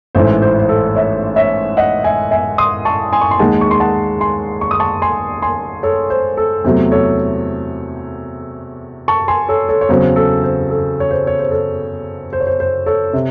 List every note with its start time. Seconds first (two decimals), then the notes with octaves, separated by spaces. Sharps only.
0.15 A1 G#2 E3 A3 C5
0.42 C5
0.59 C5
0.69 A4
0.95 C#5 E5
1.36 C#5 E5
1.77 D#5 F#5
2.04 E5 G#5
2.31 E5 G#5
2.58 C6 D#6
2.85 A5 C#6
3.13 G#5 C6
3.21 C#6
3.31 C6
3.39 D#2 D#3 G#3 F#5 A5
3.61 C#6
3.71 C6
3.80 F#5 A5
4.21 G#5 C6
4.61 C#6
4.71 D#6
4.80 A5 C#6
5.02 G#5 C6
5.42 G#5 C6
5.83 A4 C#5
6.10 C5
6.37 A4
6.64 E2 C3 F#3 A3 C5
6.91 A4 C#5
9.08 A5 C#6
9.28 G#5 C6
9.49 A4 C#5
9.69 A4 C#5
9.81 C#5
9.89 E2 C#3 F#3 C4 C5
10.16 A4
10.43 C5
10.70 A4
11.00 C#5
11.11 C5
11.27 C#5
11.39 C5
11.51 A4
12.33 C5
12.40 C#5
12.47 C5
12.60 C5
12.86 A4 C#5
13.13 C3